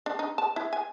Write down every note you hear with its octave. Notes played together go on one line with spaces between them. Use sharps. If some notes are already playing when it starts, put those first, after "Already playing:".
D4
D#4
A5
E4
G#5